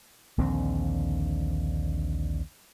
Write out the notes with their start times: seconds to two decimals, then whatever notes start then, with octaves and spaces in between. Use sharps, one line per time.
0.38 A#1 D#2 D3 C4